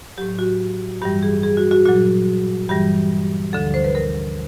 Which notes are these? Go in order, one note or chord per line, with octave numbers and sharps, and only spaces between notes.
A2 F#3 G4
F#4
G2 E3 G3 G4
G#4
G#4
F#4
F#4
A#2 F#3 F#4
G2 E3 G3 G4
D2 D3 F3 A4
C5
B4
A#4